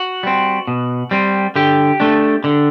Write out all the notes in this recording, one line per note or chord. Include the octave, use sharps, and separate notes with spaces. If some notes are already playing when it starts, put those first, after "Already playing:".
Already playing: F#4
G3 C4
B2
G3 C4
D3 G4
A3 D4
D3